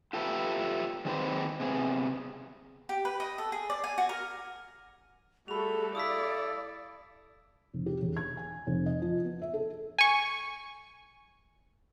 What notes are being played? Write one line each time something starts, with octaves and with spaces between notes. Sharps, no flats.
F4 G4 A4 B4 E5
D#3 G#3 C4 F#4 B4 C5
C3 B3 G#4
G4
B4
D#5
A4
G#4
D5
G#5
F#4
A#4
G3 A3 F#4 G#4 A4 B5 F7
E4 A4 D5 F5 D#6 E6 B6
F1
G4
E1
G#6
G#5
F1
D#5
F3
B3
E5
A4
G#5 C#6